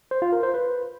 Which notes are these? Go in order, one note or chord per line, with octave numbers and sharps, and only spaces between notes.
C5
F4
A#4
C5
B4